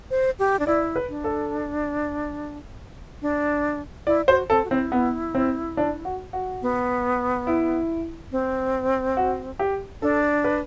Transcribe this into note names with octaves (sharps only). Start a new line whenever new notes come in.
C5
G4
D4
E4 D5
B4
D4
A4
D4
E4 D5
F#4 C5
C4 A4
F#4
C4 E4
B3
C4
D4
F#4
F#4
B3
E4
C4
F#4
G4
D4 A4
B4